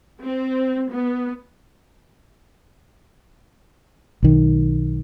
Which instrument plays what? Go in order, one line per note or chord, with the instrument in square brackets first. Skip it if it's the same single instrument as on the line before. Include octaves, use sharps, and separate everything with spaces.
[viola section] C4
B3
[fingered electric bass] B1 D#3